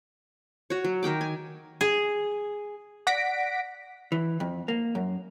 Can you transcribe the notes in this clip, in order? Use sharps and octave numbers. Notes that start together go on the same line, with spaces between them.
F#4 C#5
F#3
D#3 A#4 G5 D6
G#5
G#4
D5 F#5 A#6 B6 D7
E3
F2
A#3
F#2